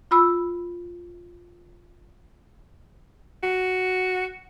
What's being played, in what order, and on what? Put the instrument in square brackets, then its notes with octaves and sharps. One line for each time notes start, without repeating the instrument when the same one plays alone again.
[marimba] F4 B5 E6
[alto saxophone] F#4